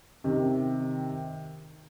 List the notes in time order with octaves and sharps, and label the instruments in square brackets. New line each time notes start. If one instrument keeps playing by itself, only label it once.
[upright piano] C3 D#3